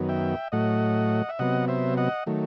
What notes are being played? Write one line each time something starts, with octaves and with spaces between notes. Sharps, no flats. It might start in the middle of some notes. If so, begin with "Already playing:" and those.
Already playing: F#2 D#3 F#3 B3
E5 G5
A2 F#3 A3 D#5 F#5
E5
C3 F#3 B3 D#5 F#5
C5 E5
D#5 F#5
D#3 F#3 A3